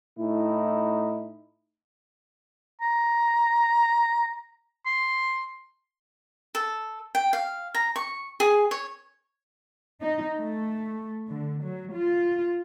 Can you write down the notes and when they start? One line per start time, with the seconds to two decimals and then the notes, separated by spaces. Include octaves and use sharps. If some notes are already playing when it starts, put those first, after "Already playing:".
0.20 A2 D#4 E4
2.81 A#5
4.86 C6
6.55 A4
7.15 G5
7.33 F5
7.75 A#5
7.96 C#6
8.40 G#4
8.71 C#5
10.01 D#4
10.37 A3
11.28 D3
11.63 F#3
11.96 F4